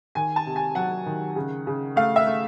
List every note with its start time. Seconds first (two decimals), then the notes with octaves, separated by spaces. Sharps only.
0.15 D#3 G#5
0.36 A5
0.46 C3
0.56 G#5
0.75 F#3 F#5
1.06 D#3
1.36 C#3
1.67 C#3
1.96 A3 F5
2.16 E5
2.27 A3